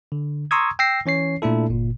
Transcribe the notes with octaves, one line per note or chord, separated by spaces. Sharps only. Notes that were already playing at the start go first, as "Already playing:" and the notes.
D3
A#5 C6 C#6 D#6 E6 G#6
G5 E6 A#6 C7
E3 C#4 C#5 C7
A#2 A3 D4 E4 A4
G1 A#2